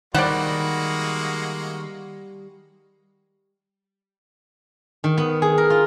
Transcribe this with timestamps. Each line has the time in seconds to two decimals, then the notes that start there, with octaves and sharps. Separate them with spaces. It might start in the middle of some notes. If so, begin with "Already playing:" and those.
0.14 D#3 G3 G#3 A#3 F#4 D5 F#5
5.04 D#3
5.17 B3
5.42 G#4
5.58 A#4
5.70 F4